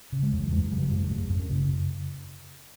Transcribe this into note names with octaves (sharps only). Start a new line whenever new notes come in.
C#3
G#3
E2
F#3
F#2 G#3
C#3 F#3
F#3
F#2 G#3
F#2 A3
F#2
C#4
C#3